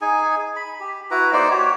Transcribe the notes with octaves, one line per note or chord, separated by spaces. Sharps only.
D#4 G#4 G#5
B5
G4
E4 F#4 B4 A#5
A#3 D#4 C5 D5
F#4 G4 C#5